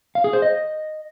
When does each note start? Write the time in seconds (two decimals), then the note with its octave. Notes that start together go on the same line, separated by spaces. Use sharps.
0.15 F5
0.24 G#4
0.33 C5
0.42 D#5